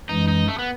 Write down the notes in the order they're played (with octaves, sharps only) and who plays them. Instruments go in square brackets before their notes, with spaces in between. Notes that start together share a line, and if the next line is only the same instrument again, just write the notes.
[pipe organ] F#2 E3 G#3 [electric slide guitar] D#4
[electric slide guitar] D#4
A3
B3